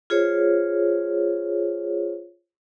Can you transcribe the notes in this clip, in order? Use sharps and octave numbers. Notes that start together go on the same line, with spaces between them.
F4 G#4 C5 C#5